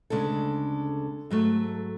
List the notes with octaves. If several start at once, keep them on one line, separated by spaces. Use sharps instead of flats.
D2 C#3 G#3 D4 A4
G#2 F#3 A3